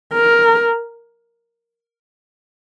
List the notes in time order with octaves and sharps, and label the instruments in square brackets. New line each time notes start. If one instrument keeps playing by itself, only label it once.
[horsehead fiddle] A#4